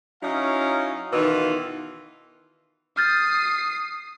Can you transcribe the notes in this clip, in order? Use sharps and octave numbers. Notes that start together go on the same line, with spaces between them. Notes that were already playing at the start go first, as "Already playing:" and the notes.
F#3 C#4 D#4 E4 F5
B2 D#3 E3 D#4 F4
D#6 F6 G6 A6 C7